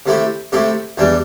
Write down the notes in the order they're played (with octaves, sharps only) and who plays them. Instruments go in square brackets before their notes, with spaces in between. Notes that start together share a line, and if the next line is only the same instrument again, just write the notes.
[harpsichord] C3 A3 E4 G4
C3 A3 E4 G4
E2 E3 G3 D4